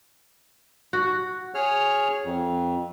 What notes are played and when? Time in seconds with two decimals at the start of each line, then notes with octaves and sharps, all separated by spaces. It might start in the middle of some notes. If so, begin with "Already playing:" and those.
0.93 F#4
1.55 G#4 C#5 F6
2.25 F2